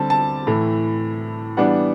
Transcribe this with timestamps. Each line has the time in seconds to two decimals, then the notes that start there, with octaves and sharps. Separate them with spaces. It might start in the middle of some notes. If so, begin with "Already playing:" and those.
Already playing: D3 G3 C4 A5
0.10 A5
0.47 A2 E3 A3
1.57 E3 G3 B3 D4 F#5